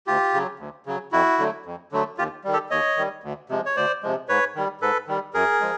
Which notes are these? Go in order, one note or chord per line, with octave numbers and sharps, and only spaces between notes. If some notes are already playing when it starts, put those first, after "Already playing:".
D2 F4 G4
C#3 F#3
D2
C#3 F#3
F2 E4 F#4
D3 F#3 A3
F2
D3 F#3 A3
D#2 F4 G4
D#3 G3
G4 A4
D#2 C#5 D#5
D#3 G3
D2
C3 F3 G#3
C#5
D2 C5 D5
C3 F3 G#3
G#2 B4 C#5
D#3 G3
G#2 A4 B4
D#3 G3
F#2 G#4 A#4
F3 G#3